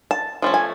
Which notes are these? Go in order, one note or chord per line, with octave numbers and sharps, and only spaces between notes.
A5
F3 A3 C#4
G#5